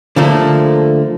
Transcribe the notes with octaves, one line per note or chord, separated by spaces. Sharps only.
D3 F3 A3 A#3